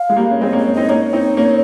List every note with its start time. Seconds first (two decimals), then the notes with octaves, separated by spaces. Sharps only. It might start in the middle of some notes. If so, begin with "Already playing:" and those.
Already playing: F5
0.09 G#3
0.16 G3 A#3
0.31 C#4
0.41 G#3 C4 D#5
0.53 A#3 C#4
0.58 C#5
0.73 C4 D#4 D#5
0.89 A#3 C#4 C#5
1.13 C4 D#4
1.37 A#3 C#4